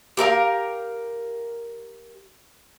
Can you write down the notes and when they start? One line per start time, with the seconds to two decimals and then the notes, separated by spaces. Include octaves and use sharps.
0.17 G4 A#4 E5 F5